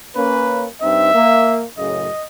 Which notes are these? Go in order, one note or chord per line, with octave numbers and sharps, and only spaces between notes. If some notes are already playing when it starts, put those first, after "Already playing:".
A#3 C#4 B4
G2 C4 D#4 E5
A#3
F#2 A2 C#3 D#5